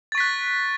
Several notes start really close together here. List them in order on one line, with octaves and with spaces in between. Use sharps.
A6 C#6 B6 F#6